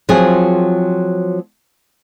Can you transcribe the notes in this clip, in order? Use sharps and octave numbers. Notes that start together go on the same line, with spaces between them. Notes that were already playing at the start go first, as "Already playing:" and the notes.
F3 F#3 C4 F4 G#4